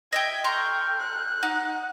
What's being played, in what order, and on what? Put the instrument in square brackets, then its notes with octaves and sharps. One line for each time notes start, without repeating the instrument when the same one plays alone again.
[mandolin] D#5 E5 G5 [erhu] G#6
[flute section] A4 F6 G6 [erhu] G5 [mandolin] A#5 C6 C#6
[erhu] F#6
[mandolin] D#4 [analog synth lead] F#5